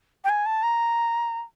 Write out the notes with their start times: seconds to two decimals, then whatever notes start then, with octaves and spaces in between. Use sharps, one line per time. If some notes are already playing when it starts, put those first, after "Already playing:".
0.24 G5
0.29 G#5
0.46 A5
0.63 A#5